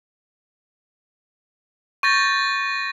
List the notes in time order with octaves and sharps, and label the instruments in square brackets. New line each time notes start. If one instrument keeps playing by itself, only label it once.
[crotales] C#6 G6 A6 A#6